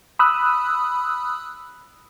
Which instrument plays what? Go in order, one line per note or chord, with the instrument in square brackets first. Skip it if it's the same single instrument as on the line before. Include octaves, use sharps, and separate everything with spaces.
[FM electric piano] B5 D#6 E6 F#6